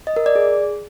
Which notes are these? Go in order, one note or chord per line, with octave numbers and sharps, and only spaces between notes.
D#5
A#4
D5
G#4